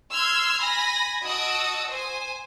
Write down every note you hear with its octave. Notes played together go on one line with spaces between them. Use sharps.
C6 E6 F6 G#6 C7
G#5 B5 A#6
F#4 D#5 A5 D#6 E6 D7
C5 G#5